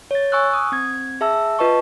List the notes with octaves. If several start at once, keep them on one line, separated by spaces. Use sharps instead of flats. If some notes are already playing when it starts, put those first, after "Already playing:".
C#5 A6
G#5 C#6 E6 F#6
D#6
C4 G#6
G#4 E5 A5 E6
F4 B4 D#5 A5 C#6